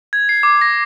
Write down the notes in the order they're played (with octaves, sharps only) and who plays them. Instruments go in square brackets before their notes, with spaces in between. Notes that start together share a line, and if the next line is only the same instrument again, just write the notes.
[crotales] G#6
C7
D6
A#6